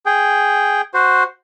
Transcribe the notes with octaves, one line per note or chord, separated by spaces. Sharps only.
G#4 G5
F#4 C5